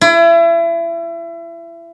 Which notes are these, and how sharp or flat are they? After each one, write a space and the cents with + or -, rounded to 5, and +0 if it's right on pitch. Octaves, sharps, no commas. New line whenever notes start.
E4 +30